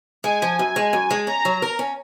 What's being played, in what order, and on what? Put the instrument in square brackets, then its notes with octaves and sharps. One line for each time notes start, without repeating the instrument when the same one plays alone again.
[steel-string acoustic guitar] G#3 [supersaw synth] G#5
[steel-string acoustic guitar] F3
F#2
G#3
F#2
G#3
[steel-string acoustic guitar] C#4 [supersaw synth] A#5
[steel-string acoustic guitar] F#3
A#4
C#4